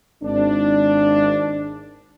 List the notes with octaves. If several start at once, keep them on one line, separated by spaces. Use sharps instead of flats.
G#1 D4